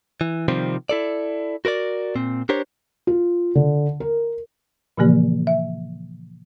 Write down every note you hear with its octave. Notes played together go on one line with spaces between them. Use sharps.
E3
C3 D#3 F3 G3 C4
E4 A4 D5
F#4 A#4 B4 D5
A#2 C4
D4 G4 A#4 C5 C#5
F4
D3
A#4
A#2 C#3 E3 F3 A#3 G4
E5